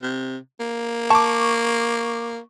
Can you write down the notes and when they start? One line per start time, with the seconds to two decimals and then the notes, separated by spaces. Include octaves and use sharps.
0.02 C3
0.60 A#3
1.10 A5 C#6 D6